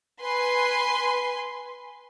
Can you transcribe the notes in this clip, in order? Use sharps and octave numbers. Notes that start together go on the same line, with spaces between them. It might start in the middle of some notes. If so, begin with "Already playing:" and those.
B4 G#5 C6